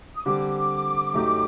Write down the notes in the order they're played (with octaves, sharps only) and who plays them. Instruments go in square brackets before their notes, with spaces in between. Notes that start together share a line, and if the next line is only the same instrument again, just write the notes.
[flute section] D#6
[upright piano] D3 G3 C4 G4 [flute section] D6
[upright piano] F#2 F#3 A3 D#4 G4